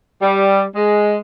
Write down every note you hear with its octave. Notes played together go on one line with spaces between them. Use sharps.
G3
G#3